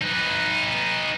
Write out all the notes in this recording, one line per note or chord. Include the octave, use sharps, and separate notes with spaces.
D#4 B4